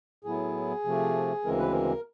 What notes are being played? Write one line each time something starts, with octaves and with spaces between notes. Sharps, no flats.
A2 F#3 B3 E4 G#4
C3 F3 A3
D2 C#3 E3 G#3 C4 A#4
B4
A#4